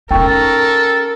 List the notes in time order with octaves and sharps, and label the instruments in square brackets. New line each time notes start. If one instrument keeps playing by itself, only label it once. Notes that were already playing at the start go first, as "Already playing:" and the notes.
[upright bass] C#4 D#4 [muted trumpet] A4 [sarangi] A#4 [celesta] G5 C#6